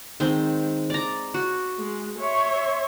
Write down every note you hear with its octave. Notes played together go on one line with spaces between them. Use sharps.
D#3 G#3 C4
D5 A#5
F#4
G#3
C#5 E5 C6